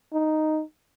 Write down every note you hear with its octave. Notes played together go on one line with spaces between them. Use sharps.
D#4